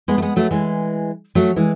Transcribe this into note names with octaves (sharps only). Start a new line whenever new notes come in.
G#3 B3
A3
G#3 B3
F#3 A3
E3 G#3
F#3 A3
E3 G#3